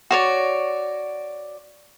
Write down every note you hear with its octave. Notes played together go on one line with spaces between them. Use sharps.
F#4 C#5 D5